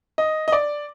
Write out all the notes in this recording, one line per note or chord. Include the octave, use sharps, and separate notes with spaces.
D#5
D#5
D5